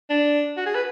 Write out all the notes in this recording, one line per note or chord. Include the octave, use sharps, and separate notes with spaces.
D4
F#4
G#4
B4